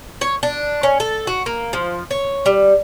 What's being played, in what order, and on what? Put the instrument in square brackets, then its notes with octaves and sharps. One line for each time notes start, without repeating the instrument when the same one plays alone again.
[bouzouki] C#5
D4
C#4
A4
F#4
A#3
F3
C#5
G3